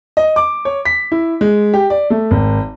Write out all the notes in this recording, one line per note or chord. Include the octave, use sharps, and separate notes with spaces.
D#5
D6
C#5
B6
E4
G#3
G4
D5
A3
G#1